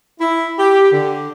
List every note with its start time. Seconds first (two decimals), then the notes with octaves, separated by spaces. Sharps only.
0.20 E4
0.59 G4
0.92 D3